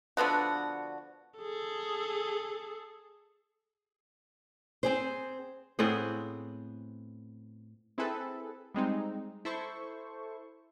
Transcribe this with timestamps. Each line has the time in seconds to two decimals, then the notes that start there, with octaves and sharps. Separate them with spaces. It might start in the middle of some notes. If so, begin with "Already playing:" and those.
0.17 D3 F3 B3 F#4
1.39 G#4 A4
4.83 C4 G#4 C5
5.79 A2 B3 C4 G#4
7.98 C4 E4 G#4 A4 B4
8.74 G3 G#3 C4 D#4
9.45 E4 A4 C5 C#6